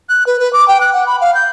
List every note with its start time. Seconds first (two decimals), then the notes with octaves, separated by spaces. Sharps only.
0.09 F#6
0.27 B4
0.39 B4
0.53 D6
0.68 G5
0.81 F#6
0.93 F#5
1.07 B5
1.21 F5
1.35 G6